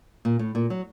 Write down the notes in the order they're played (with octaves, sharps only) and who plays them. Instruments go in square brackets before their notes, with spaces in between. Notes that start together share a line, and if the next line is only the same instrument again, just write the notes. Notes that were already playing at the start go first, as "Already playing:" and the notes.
[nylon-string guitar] A#2
A2
A#2
F#3